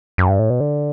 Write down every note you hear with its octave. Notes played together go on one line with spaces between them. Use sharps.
F#2
G2
A2
B2
D3